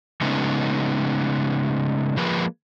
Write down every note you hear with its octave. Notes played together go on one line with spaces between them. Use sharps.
C#3 G#3 A3 B3 C#4 D#4
F3 G#3 A#3 B4